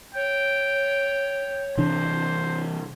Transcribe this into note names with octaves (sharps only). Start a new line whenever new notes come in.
C#5 G5
C3 E3 D4 C5